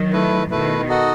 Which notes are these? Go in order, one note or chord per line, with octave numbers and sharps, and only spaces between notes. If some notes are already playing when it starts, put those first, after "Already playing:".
Already playing: D#3 F#3
A3 E4 B4
B2 D#3 A3 E4 B4
D#4 F#4 A4 D#5 F#5